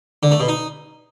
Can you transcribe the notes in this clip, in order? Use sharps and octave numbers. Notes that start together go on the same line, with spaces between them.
D3
A3
B2
D#4